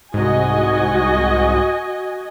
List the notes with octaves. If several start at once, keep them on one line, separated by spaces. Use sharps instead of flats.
C2 G#2 F#4 D#5 G#5